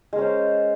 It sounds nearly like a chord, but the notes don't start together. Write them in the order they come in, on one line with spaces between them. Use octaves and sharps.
G#3 A#4 C#4 C5